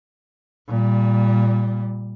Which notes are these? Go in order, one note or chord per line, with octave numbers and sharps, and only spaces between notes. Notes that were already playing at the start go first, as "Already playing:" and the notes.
A#2 G3